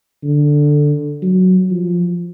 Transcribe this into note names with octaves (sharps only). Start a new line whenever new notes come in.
D3
F#3
F3